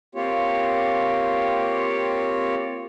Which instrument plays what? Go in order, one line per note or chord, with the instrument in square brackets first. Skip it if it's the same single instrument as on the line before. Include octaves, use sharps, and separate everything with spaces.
[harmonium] A#3 C4 F4 G4 C#5